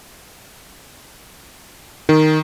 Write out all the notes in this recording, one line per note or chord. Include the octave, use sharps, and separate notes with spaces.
D#3